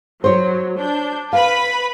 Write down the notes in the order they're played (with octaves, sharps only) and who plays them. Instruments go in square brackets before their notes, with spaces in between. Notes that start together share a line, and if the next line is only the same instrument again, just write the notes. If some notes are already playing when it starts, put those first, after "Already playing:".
[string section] F#3 [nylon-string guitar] C5 C#5
[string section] D4 G6
[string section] B4 B5 [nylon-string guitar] F5